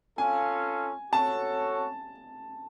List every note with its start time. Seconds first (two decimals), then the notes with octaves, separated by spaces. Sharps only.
0.18 C#4 F4 A4 F5 G#5
1.12 F#4 A4 C#5 A5